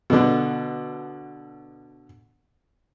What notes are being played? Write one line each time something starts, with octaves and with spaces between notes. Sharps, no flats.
B2 D3